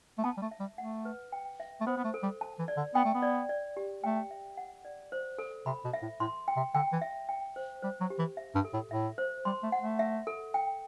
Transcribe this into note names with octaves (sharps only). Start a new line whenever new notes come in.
A3
B3 A5
G3
A3
E5
G3
A3 F#5
B4
G5
E5
A3
B3 C5
B3
A3
A4
G3
A5
E3
D5
D3
B3 G5
A3
B3
D5
D5
G4
A3 G5
E5
F#5
D5
C5
A4
C3 B5
B2
E5
A2
A2 C6
G5
C3
D3 G5
E3
E5
G5
C5
G3 C5
F#3
G4
E3
E5
G2
A4
A2
A2 E5
C5
G3 C6
A3
F#5
A3
E5
A4
G5